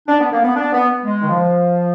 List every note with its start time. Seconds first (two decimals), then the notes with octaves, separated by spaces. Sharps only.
0.08 D4
0.20 B3
0.32 A#3
0.44 B3
0.56 D4
0.72 B3
1.05 G#3
1.22 D#3
1.28 F3